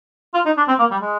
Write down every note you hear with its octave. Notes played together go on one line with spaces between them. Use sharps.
F4
D#4
D4
C4
A#3
G3
G#3